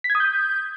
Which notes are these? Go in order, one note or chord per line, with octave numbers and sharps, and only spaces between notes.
B6
G#6
D#6
G6